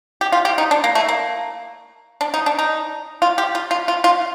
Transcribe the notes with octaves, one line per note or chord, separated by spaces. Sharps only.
G4
F4
G4
D#4
D4
A#3
A3
A#3
D4
D#4
D4
D#4
F4
G4
F4
F4
F4
F4